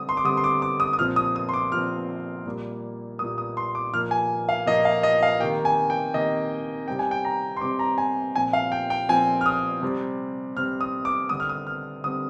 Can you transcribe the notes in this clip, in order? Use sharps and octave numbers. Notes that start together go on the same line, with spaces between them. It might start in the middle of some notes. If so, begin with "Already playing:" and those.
Already playing: D3 G3 C4 D#6
C6
D6
D3 G3 C4 D#6
C6
D6
D6
D#6
D#6
A#2 F3 C4 F6
D#6
D#6
C6
D6
A#2 F3 C4 F6
A#2 G3 A#3
A#2 G3 A#3 D#6
D#6
C6
D6
A#2 F3 A#3 F6
G#5
F5
A#2 F3 A#3 D#5
F5
D#5
F5
C3 D#3 A#3 G5
G#5
G5
C3 D#3 A#3 D#5
C3 G3 C4 G5
G#5
G5
A#5
C6
C3 G3 C4 D6
A#5
G#5
A#2 F3 C4 G#5
F5
G5
G5
A#2 F3 C4 G#5
F6
D#6
C3 G3 C4
C3 G3 C4 F6
D#6
D6
D3 G3 C4 D#6
F6
D#6
F6
D3 G3 C4 D#6